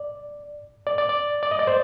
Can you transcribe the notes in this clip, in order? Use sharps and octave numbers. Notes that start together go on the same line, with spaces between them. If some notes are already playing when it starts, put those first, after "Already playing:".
Already playing: D5
D5
D5
D5
D5
D#5
D5
C5